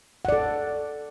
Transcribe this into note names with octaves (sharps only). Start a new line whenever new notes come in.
A4 D5 F#5